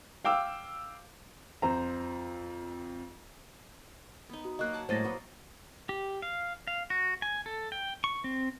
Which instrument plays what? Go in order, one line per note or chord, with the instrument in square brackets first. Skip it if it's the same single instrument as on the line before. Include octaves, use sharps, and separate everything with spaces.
[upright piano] F5 G5 D6 E6
[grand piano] F2 C5 A#5
[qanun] B3 D#4
[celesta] F#4
[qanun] F#3 A#3 F#4 [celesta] D#5 F#6
[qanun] F#5 A5 D6
[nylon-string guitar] A2 F#3 G#3 [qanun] A#3 D#5 [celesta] C5 A6 A#6
[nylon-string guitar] F#3 B3 F#4
[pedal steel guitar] G4
F5
F5
F#4
G#5
A4
G5
C#6
C4